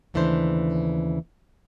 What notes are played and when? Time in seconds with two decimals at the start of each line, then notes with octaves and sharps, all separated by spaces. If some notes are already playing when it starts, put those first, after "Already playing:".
0.14 D#2 C#3 E3 A3 D4 C5